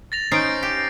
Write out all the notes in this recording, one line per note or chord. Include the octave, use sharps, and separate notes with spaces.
A6 A#6 F7
C#4 D#4 C5 C7 D7
G4